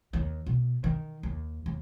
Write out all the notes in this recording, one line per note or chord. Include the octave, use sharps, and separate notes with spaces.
D#2
B2
D#3
D#2
D#2